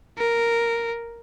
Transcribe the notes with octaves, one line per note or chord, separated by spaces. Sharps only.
A#4